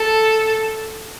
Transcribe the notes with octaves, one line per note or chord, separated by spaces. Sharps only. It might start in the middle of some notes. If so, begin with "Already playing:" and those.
Already playing: A4